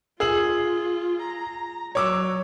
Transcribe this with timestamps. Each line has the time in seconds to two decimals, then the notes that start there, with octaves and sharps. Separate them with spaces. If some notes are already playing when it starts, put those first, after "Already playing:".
0.20 F4 G#4 E6 F#7
1.23 A#5
1.95 F#3 C#5 D6 E6